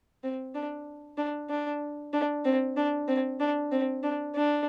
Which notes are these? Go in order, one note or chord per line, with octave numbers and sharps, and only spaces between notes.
C4
D4
D4
D4
D4
C4
D4
C4
D4
C4
D4
D4